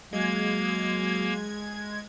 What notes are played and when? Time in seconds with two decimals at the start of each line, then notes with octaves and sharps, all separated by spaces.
0.13 F#3 G#3 A#3 G#6